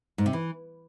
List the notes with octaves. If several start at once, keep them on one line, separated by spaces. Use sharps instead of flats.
G#2
C3
E3